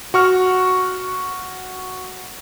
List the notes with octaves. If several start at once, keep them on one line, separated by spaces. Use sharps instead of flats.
F#4 C#6 F6